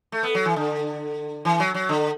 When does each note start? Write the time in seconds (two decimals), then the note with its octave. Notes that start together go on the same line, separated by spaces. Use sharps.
0.12 A3
0.23 B3
0.35 F#3
0.45 E3
0.56 D3
1.45 E3
1.60 F#3
1.74 F#3
1.89 D3